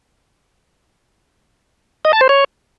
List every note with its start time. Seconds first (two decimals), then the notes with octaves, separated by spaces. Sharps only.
2.05 D#5
2.13 A5
2.21 C5
2.29 C#5